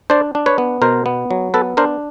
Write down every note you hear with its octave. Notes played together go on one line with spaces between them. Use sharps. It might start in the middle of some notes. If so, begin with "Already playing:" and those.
D4 C5 D5
D4
B4 C#5
B3
B2 A#4 C5
B3
F#3
B3 A4 B4
D4 A#4 C5